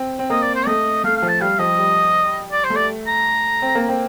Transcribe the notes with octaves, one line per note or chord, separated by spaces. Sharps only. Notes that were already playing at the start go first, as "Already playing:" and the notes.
Already playing: C4
C4
A#3 D#5
D5
C5
A3 D#5
A3 F5
F5
F3
A5
G3 F5
F3 D#5
G3
D5
C5
A3
D5
A#5
C4
A#3
C4